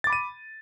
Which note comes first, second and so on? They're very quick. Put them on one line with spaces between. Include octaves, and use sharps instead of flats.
A6 D6 B5 D#7